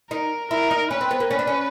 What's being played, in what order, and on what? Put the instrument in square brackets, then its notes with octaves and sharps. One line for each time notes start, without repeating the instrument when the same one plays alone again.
[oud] D#4 [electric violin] A#4
[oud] E4 [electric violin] A#4
[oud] D#4
[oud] C#4 [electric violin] B4
[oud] C4
B3
A#3
[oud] C#4 [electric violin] B4
[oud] D4
C#4